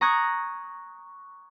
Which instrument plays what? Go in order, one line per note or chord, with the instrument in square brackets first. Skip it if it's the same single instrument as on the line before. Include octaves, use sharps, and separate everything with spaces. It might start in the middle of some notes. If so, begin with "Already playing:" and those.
[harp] A#5 C#6 D#6 F#6 G#6